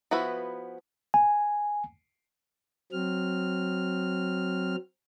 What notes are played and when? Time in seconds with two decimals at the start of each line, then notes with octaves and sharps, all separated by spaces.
0.11 F3 B3 E4 F#4 B4
1.14 G#5
2.92 F#3 C4 F6